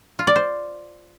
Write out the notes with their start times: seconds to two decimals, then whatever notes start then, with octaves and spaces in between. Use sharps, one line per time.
0.19 F4
0.27 D5
0.36 C5